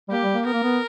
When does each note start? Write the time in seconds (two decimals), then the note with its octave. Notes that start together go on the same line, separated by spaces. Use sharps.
0.08 G3
0.11 A#3 G4
0.23 G3
0.34 A#3
0.45 B3 A#4
0.53 A#3
0.63 B3